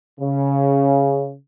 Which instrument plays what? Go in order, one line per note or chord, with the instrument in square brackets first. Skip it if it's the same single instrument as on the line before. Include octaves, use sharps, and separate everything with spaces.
[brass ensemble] C#3